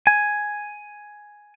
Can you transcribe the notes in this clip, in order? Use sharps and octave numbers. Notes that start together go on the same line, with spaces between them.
G#5